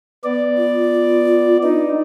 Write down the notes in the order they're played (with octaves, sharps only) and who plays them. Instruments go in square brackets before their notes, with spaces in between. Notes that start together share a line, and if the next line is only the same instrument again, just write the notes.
[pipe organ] B3 D5
[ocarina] F4
[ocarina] D4 [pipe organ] D#4